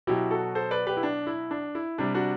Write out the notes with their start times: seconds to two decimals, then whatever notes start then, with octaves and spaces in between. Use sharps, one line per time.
0.07 B2 F#3 E4 G4
0.31 F#4 A4
0.55 A4 C5
0.71 B4 D5
0.87 G4 B4
0.97 E4
1.03 D4
1.27 E4
1.51 D4
1.75 E4
1.98 C3 G3 D4
2.14 D4 F#4